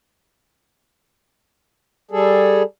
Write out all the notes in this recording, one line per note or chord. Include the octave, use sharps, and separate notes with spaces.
G3 G#4 A4